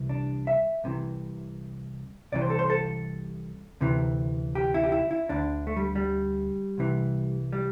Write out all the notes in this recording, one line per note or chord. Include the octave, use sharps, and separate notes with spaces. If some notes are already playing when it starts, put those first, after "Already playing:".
Already playing: C2 C3 E3
D4
E5
C2 C3 E3
C2 C3 E3 D5
C5
A4
C5
A4
D2 C3 E3
G4
E4
G4
E4
E4
D2 D3 D4
A3
G3
G3
C2 C3 E3
G3